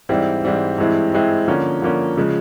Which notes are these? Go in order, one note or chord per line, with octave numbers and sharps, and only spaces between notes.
G#2 E3 G3 C4 E4
G#2 E3 G3 C4 E4
G2 E3 G#3 C4 E4
G2 E3 G#3 C4 E4
D3 F3 A#3 C#4
D3 F3 A#3 C#4
C#3 F3 G#3